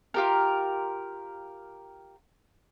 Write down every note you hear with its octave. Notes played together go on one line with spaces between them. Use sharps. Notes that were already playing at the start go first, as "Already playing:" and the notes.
F4 G4 A#4